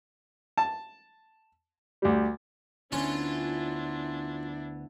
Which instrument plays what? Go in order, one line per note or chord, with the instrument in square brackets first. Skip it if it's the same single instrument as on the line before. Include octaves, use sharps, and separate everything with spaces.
[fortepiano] A5
D2 G3
[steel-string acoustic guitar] D2 B3 [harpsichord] C#4 [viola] D4 E4 [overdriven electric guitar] F4 C6